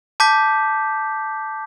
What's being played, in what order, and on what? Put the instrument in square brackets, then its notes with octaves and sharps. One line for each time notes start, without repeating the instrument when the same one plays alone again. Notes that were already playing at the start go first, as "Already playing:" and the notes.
[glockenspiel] A5 D6 G6 B6